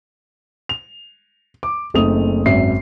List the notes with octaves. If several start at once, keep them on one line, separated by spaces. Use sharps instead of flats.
F7
D6
F#1 A3 C4 D#4 D#6 F7
G#1 F#2 E5 C7